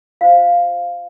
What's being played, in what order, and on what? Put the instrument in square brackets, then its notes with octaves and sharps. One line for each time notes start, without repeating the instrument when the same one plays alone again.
[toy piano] F4 C5 F5